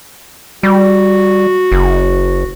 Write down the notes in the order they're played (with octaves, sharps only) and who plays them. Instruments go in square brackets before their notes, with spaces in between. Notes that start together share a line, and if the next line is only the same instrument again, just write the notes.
[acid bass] G3 [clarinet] F#4
[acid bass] F#1